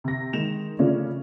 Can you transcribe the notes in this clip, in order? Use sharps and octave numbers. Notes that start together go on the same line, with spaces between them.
C3 A#6
D#3 G#3 D#4 E7 F7
C#3 F3 A3 C#4 D4